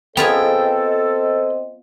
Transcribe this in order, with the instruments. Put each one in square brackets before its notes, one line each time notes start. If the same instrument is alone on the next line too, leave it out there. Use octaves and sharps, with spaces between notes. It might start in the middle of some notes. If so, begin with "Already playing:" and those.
[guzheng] B3 F4 G#4 [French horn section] C4 C5 D#5 [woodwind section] A4 [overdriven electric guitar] G5